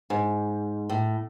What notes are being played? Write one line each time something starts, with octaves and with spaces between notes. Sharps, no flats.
G#2
A2